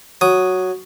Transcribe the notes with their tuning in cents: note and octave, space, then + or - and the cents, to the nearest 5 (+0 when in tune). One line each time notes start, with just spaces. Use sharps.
F#3 +0 D#6 +0